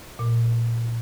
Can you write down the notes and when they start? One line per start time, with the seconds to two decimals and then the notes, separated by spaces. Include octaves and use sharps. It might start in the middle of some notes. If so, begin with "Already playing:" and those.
0.19 A#2